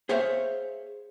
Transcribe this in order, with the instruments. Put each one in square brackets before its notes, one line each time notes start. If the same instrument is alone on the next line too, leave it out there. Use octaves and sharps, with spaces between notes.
[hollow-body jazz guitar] G#4 C5 C#5 E5 F5